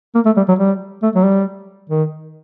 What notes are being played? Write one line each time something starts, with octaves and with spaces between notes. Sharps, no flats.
A#3
A3
G3
F#3
G3
A3
F#3
G3
D#3